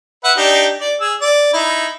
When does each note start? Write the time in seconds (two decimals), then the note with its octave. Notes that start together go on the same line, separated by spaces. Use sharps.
0.24 B4 E5 F#5
0.37 D4 D#4 G4
0.80 D5
1.00 G#4 E6
1.21 D5
1.53 D#4 E4